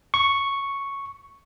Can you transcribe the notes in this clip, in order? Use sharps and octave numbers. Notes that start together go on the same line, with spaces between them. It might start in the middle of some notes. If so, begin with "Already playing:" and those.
C#6